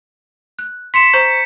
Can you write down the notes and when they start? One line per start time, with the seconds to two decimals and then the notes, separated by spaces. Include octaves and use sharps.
0.59 F#6
0.94 C6 B6 C#7 E7
1.14 C5 A#5 C#6 G6